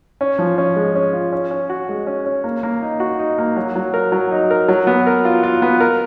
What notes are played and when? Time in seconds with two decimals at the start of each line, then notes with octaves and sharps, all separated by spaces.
0.21 C#4
0.39 F3
0.58 C#4
0.76 G#3
0.95 C#4
1.13 F4
1.32 C#4
1.51 C#4
1.70 F#4
1.89 G#3
2.07 C#4
2.26 C#4
2.44 A#3
2.63 A#3
2.82 D#4
3.00 F#4
3.19 D#4
3.38 A#3
3.56 F#3
3.76 F#3
3.94 A#4
4.12 F#3
4.31 D#4
4.51 A#4
4.68 F#3
4.87 B3
5.07 A#4
5.25 F4
5.43 F4
5.62 B3
5.80 A#4